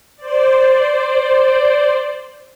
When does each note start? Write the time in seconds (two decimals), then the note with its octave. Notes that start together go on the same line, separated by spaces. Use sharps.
0.16 C5 D5